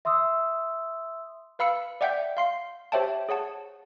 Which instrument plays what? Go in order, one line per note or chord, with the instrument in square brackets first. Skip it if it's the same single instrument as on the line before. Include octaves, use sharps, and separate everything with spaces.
[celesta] E5 C6 D#6 E6
[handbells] B4 F5 B5 E6 C#7
D5 E5 F#5 G5 G6 B6
F5 C6 C7
G4 C5 C#5 E5 G5 A5
G#4 C#5 F#5 A5